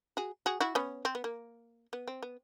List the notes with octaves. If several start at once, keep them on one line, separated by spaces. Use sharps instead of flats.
F#4 G#4
F#4 G#4
E4 F#4
B3 C#4
C4
B3
A#3
B3
C4
B3